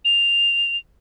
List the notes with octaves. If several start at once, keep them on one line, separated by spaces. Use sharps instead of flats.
F7